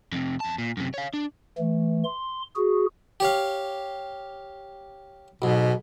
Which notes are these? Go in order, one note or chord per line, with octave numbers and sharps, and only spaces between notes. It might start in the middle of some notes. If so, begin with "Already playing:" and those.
F2 C3
F2 A5
A#2
F#2 C3
C#5 F5
D4
E3 A3
C6
F#4 G#4
G4 C#5 F5
B1 G#2 B2